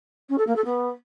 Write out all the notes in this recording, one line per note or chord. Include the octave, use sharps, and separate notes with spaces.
C#4
A4
A#3
A4
B3